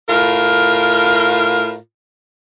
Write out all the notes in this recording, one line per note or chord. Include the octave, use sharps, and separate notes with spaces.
A2 F4 A#4